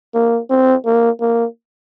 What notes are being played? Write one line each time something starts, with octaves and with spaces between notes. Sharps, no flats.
A#3
C4
A#3
A#3